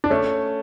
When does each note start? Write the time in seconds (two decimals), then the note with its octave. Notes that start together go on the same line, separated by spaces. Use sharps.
0.04 D4
0.10 A3 C#4